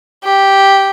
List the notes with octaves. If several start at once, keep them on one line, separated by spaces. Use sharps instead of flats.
G4